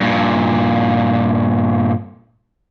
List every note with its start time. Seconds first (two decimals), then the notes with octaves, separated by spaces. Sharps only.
0.01 G2 A#2